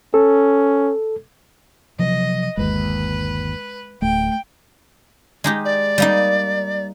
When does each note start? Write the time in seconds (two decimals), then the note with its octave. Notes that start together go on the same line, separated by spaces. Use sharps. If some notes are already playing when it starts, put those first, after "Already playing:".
0.14 C#4 A4
1.99 C3 F3 F#3 D#5
2.57 G1 D#2 G#3 B4
4.02 D1 A3 G5
5.44 G#3 D#4 G4
5.65 D5
5.98 G3 A#3 D#4